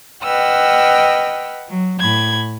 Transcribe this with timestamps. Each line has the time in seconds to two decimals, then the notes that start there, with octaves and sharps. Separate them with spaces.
0.23 B4 D#5 F#5 G5 E6 F6
1.68 F#3
2.00 A2 B5 G#6